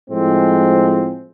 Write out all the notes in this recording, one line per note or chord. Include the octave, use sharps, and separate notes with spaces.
A2 F3 G#3 C4